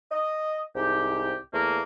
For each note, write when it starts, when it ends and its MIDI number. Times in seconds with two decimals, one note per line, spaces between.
0.12 0.60 75
0.75 1.35 36
0.75 1.35 44
0.75 1.35 67
1.52 1.81 40
1.52 1.81 57
1.52 1.81 58